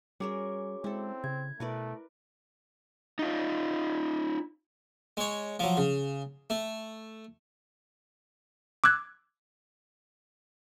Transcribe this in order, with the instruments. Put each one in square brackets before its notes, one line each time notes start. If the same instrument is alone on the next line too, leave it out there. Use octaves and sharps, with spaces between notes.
[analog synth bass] G3 [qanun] C#4 A#4 C#5 [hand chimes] F#4 G#4 D6
[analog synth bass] G#3 [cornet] C4 [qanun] E4 A4
[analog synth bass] C#3 [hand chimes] G#6
[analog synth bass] B2 [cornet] A3 [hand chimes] E4 [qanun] A#4 B4 D5
[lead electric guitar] D#4 F4
[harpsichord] G#3 C#5
F3 F#3
C#3
A3
[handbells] D6 E6 F#6 G#6